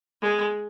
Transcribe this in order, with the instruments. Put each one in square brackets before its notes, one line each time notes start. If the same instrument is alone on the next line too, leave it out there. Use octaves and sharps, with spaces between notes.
[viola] G#3